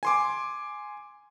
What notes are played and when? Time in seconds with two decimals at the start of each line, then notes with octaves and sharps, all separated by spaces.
0.03 G#5 C6 D6